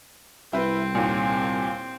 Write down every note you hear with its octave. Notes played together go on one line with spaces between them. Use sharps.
C2 C4 E4 B4
D#2 A#2